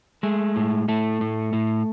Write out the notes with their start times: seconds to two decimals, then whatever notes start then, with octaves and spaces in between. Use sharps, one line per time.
0.23 G#3 A3
0.56 A2
0.88 A2 A3
1.21 A2
1.53 A2